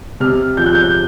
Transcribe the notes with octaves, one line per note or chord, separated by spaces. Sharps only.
C3 F6
F3 G6
F#6
G6